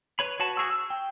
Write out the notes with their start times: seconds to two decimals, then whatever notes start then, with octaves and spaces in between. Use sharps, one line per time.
0.19 B4 C#5 B5
0.40 F#4 B4 C#5 F#5 A5
0.57 F#4 G#4 C#6 E6
0.70 E6
0.90 G5